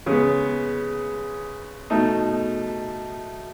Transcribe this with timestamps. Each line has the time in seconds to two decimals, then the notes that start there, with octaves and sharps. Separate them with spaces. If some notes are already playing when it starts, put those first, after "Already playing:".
0.06 C#3 G#3 B3
1.90 B2 A3 D#4